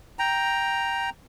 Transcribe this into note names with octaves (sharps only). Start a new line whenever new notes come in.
G5 A#5